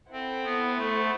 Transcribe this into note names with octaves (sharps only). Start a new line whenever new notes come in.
C4 E4 A4 C5 F#5
B3
A3